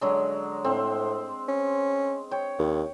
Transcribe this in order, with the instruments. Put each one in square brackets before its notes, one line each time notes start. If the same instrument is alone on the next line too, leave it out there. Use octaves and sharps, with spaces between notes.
[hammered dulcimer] D3 F#3 G#3
[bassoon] A2 [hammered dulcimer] C4
[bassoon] C#4
[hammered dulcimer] C#5 G5
[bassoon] D#2